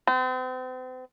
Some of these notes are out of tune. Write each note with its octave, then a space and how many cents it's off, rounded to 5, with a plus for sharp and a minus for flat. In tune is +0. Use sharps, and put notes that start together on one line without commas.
C4 -40